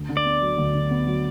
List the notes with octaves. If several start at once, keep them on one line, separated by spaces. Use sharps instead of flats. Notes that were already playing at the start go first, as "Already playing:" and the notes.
Already playing: D2
D3
D5
B3
F#3
D2
D3
B3
F#3